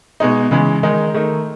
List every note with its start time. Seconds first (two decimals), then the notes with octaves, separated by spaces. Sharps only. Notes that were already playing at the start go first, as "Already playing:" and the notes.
0.20 B2 G#3 D#4
0.51 C#3 E3 G#3
0.83 D#3 G#3 D#4
1.14 D#3 A3 D#4